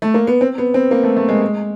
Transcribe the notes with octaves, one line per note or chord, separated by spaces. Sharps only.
A3
A#3
B3
C4
B3
C4
A#3
A3
A3
G#3
G#3